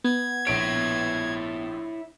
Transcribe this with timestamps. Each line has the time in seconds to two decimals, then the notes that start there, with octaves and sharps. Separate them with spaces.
0.04 B3 G#6
0.47 A#1 E4 C#5 D7